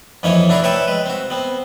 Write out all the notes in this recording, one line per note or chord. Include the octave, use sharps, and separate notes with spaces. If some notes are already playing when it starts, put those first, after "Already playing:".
F2 E3 A#3 C#4 D#4 C#5
D4 E4 F#4 G#4 A#4 D5
B4 C#5 E5 G5 A5 D6
G#3 B4
C4 F#4
B3 C4